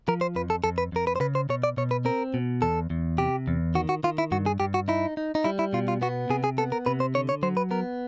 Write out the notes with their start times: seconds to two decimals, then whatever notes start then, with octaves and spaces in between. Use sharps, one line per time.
0.08 F3 A#4
0.21 C5
0.35 F2 B4
0.50 A4
0.64 F2 A4
0.78 B4
0.92 F2 A#4
1.07 B4
1.16 C5
1.20 C#3 B4
1.35 C5
1.49 B2 C#5
1.64 D5
1.77 B2 C#5
1.91 B4
2.05 C4 A#4
2.34 B2
2.62 E2 A4
2.90 E2
3.18 C3 G4
3.48 E2
3.75 D#3 F#4
3.89 F#4
4.03 D#3 F4
4.18 E4
4.32 G2 F#4
4.46 G#4
4.60 G2 G4
4.74 F#4
4.88 D#4 E4
5.17 D#4
5.35 D#4
5.44 G3 E4
5.59 E4
5.73 B2 F4
5.88 F4
6.02 B3 F#4
6.30 C3 G#4
6.44 G#4
6.58 B3 A4
6.72 A#4
6.86 C3 B4
7.00 C5
7.14 D3 C#5
7.29 C#5
7.43 F#3 C5
7.57 B4
7.71 B3 A#4